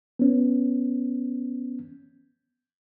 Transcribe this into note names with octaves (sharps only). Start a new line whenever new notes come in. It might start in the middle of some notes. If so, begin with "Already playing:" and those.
B3 C#4